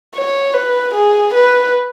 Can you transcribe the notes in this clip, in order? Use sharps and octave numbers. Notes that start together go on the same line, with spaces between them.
C#5
B4
G#4
B4